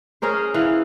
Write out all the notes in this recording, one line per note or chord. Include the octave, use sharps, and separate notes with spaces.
C#4 G#4 A#4 C5
E3 F5